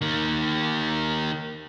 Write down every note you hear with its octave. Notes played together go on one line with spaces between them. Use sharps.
D#3 A#3